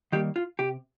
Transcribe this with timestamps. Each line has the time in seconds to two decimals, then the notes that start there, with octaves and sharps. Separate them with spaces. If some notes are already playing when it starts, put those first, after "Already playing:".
0.12 D#3 G3 A#3 G4
0.36 F4
0.59 C3 G4